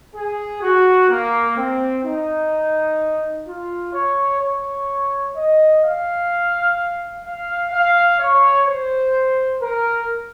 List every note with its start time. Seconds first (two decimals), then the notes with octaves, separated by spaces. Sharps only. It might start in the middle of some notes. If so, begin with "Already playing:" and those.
0.15 G#4
0.62 F#4
1.10 A#3
1.57 C4
2.04 D#4
3.46 F4
3.94 C#5
4.41 C#5
5.35 D#5
5.83 F5
7.24 F5
7.72 F5
8.19 C#5
8.67 C5
9.61 A#4